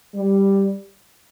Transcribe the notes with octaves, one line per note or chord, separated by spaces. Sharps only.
G3